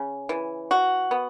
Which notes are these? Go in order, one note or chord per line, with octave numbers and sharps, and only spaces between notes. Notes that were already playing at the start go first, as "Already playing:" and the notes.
Already playing: C#3
E3
F#4
B3